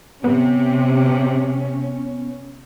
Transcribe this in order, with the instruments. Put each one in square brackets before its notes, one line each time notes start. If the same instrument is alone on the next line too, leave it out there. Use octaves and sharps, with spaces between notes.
[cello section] C3 [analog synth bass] B3 [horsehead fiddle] C#4